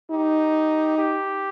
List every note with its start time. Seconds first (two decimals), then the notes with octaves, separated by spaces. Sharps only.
0.11 D#4 G4
0.98 G4